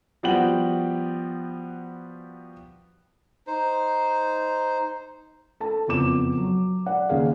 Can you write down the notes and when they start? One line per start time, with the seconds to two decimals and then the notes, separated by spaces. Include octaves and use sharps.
0.23 F3 G3 B3 F#4 G5 F#7
3.47 D#4 C5
5.60 A4 A5
5.88 F#1 F2 B3 D6 E7
6.38 F#3
6.86 D5 F#5
7.09 D#2 C#3 A#3 G#4 F5